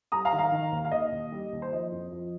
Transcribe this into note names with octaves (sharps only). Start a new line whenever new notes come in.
G3 A#5 D#6
F5 A#5
D#3
F5 A#5
D#3
D#2
F5
D#2 D#5
D#2
G3
D#2
C5
F3 D#5
F2
F3